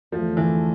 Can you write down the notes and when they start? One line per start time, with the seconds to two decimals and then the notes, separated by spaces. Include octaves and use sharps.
0.12 E2 D3 F3 A3
0.37 E3